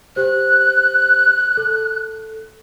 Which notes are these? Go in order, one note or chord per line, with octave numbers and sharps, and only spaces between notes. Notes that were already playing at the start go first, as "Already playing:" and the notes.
G4 C5 F#6
A4